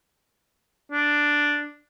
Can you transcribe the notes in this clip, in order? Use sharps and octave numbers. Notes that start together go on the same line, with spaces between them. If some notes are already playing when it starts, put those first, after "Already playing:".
D4